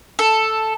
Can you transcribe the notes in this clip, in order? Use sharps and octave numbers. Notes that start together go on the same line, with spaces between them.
A4